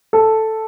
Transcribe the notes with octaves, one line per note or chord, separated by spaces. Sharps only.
A4